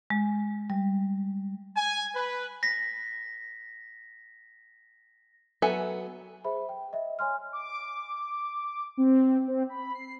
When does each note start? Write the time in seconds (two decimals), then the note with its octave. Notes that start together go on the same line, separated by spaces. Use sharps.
0.10 G#3
0.70 G3
1.76 G#5
2.15 B4
2.63 A#6 B6
5.62 F#3 B3 A4 E5 G#5
6.44 G#4 C5 E5 B5
6.69 G5
6.93 D#5 E5
7.19 C#5 G#5 C6 F6
7.53 D6
8.97 C4
9.48 C4
9.69 B5
9.94 C7